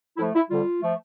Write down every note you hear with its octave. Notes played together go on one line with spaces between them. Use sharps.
A2 F3 A3 E4
E4
F2 D3 G3 F4
F3 A3